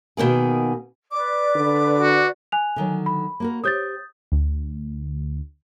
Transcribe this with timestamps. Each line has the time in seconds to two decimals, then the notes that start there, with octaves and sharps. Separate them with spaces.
0.17 B2 D#3 A#3 G#4
1.12 B4 D5 D6
1.56 D3
1.99 F#4
2.52 G#5 F#6 F7
2.76 D3 D#3 F#3
3.06 B5
3.40 A#3 F#4 A#4
3.64 G4 C5 C#5 D#6 G6 A6
4.32 D2